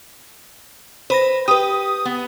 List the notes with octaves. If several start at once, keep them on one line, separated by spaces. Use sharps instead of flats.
B4 C5 B5 A#6
G4 B4 G5 D#6
B3